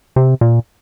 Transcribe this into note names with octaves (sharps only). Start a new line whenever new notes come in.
C3
A#2